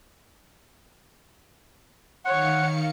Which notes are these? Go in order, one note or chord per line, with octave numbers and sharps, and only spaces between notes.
D#3 C#5 F5 F#5 C#7